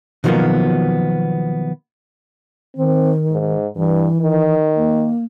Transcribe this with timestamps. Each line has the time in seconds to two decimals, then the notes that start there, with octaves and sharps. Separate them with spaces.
0.24 B2 D#3 F3 F#3 A#3 B3
2.77 D#3 C4
3.32 G#2
3.76 G2 E3
4.20 D#3
4.76 A#3